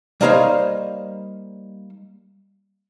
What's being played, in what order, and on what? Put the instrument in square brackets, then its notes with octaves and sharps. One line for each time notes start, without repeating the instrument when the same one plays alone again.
[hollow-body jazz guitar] G3 A#3 D#4 C5 C#5 F5